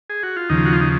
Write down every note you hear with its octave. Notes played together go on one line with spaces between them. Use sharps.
G#4
F#4
F4
D#2 C#3 F3 D#4
F#4
F4
D#4